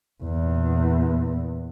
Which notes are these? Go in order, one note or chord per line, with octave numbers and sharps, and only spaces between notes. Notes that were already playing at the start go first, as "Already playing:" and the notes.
E2 A#2